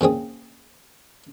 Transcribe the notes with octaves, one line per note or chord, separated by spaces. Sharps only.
A#2 C#3 C4 G#4